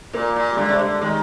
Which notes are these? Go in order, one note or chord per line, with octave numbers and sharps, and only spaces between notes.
A#2 A#3
A#2
G3
D3 G#3
C3
D3
D#3 G#3